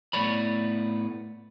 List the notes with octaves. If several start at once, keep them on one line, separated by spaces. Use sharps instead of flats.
A2 A3 B3 C#5 D5 B5